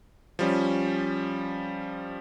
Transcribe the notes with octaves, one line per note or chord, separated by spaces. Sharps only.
F3 G3 C#4